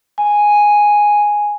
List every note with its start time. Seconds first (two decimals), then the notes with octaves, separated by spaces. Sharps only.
0.18 G#5